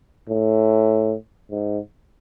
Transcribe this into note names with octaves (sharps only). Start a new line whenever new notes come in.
A2
G#2